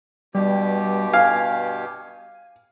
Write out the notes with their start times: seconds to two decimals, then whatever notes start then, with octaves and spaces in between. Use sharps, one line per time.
0.35 G2 B2 G3 G4
1.13 F5 G#5